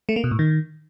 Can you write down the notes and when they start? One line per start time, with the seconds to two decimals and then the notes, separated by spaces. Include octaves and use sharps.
0.09 A3
0.16 A#3
0.24 B2
0.31 A2
0.39 D#3